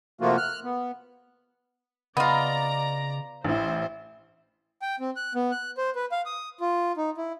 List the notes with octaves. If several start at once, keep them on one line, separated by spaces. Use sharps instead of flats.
C3 F3 A3 A#3 F4 F#4
F6 F#6
B3
C#3 B3 F4 D5 D#5 A#5
A1 E4 C5
G5
C4
F#6
B3
F#6
C5
B4
F5
D#6
F4
D#4
E4